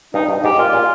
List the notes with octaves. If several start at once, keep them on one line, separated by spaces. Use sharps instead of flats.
G2 D#4
G2
G#2 G4
A#2 F4
A#2